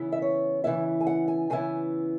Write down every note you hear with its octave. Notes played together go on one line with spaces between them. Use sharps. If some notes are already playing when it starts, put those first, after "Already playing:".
Already playing: C#3 E3 B3 E4
E5
C#5
C#3 E3 B3 E4 E5
G#5
F#5
G#5
C#3 E3 B3 E4 G#5